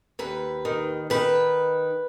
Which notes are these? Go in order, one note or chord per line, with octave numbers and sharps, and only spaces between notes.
D#2 B4
D#3
D#3 B4